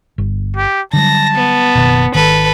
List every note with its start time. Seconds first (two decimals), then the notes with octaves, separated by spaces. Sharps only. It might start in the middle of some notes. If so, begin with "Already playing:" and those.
0.18 G1
0.56 G4
0.93 D3 F#3 G3 A5 A#6
1.35 B3
1.75 F#1 B2 D#3
2.14 G#1 D#3 A4 B4